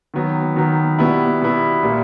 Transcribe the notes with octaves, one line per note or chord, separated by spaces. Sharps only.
D#3 F#3 B3
D#3 F#3 B3
B2 G3 B3 E4
B2 G3 B3 E4
A#2 G3 A#3